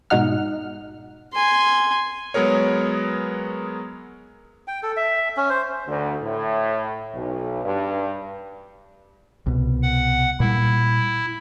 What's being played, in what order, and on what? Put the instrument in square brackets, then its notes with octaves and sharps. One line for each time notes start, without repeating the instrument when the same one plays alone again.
[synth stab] G#2 B2 D#4 F#5 F6
[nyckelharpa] G#5 C6
[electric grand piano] F#3 G#3 B3 G#4 A#4 C#5
[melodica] G5
A4
E5
C#4
C5
[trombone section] D2
A2
B1
G2
[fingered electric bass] C2 B2
[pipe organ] F#5
[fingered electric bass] A#2 G3 [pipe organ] E4